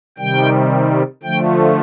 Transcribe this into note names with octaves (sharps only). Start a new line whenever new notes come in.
C3 D#3 G3 G5
D3 F3 A3 G5